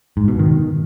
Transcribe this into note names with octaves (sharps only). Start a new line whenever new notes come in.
G#2
B2
D#3